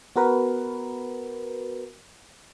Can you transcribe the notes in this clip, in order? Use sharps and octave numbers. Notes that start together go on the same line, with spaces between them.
B3 F#4 A#4 B4